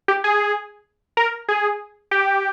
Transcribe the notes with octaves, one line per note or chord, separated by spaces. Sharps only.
G4
G#4
A#4
G#4
G4